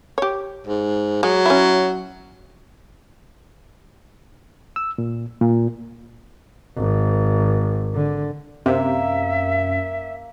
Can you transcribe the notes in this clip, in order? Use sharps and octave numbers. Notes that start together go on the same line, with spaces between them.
G4 C#5
G#2
F#3 G#3
C#4 E4
E6
A#2
A#2
G#1
D3
F#2 C3 A#3 E5